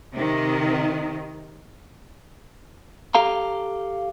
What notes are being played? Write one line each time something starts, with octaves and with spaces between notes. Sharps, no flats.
C3 D#3
G4 A4 F5 A#5